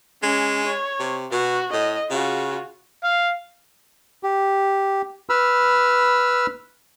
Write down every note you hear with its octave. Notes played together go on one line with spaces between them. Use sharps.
G#3 C#4
C#5
C3
B2 F#4
A2 D#5
C#3 F4 F#4
F5
G4
B4 B5 E6 F6